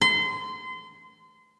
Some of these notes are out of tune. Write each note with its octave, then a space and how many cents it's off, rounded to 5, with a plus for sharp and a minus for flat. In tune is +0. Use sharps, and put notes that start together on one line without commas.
C6 -30